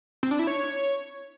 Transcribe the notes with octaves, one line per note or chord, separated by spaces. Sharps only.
C4
D4
E4
C#5